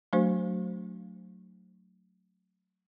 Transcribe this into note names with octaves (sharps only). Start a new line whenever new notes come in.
F#3 A3 D4 F#4 C5